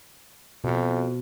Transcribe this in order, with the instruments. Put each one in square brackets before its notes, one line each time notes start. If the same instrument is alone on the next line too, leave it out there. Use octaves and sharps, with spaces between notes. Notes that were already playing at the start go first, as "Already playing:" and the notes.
[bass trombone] F2 [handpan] B2